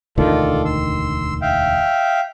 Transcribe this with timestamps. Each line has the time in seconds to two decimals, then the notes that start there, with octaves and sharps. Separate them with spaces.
0.18 E1 D2 D#3 F4 A4 D5
0.65 C6 E6
1.42 E5 F5 G5